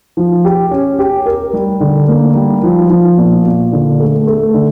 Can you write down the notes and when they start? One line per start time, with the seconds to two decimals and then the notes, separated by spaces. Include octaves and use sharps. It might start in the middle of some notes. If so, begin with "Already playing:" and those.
0.17 F3
0.45 G4
0.71 C#4
0.99 G4
1.26 A#4
1.53 G3
1.80 D3
2.08 A#3
2.35 G3
2.64 F3
2.90 F3
3.18 A#2
3.45 A#2
3.73 D3
4.00 A3
4.27 A3
4.54 D3